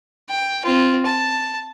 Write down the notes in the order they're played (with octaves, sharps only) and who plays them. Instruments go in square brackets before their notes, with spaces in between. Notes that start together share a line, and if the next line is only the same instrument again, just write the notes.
[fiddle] G5
C4 F4
A5